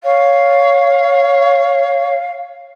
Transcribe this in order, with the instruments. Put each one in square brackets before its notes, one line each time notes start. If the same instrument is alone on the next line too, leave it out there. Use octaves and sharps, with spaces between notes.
[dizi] C#5 [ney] F5